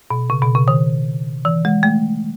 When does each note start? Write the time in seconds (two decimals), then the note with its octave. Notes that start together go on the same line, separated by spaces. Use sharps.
0.11 B2
0.30 C#3
0.42 B2
0.55 C#3
0.68 D#3
1.45 E3
1.65 G#3
1.83 A3